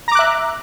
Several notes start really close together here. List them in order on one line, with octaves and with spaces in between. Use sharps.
A#5 D6 F#6 E5